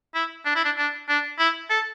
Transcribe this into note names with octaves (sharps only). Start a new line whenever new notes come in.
E4
D4
E4
D4
D4
D4
E4
A4